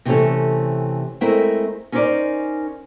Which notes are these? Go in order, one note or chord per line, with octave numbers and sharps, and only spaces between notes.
C3 E3 A3 C4 C#4 A4
G#3 A3 C4 E4 A#4 E5
C#4 D#4 A#4 C5 D5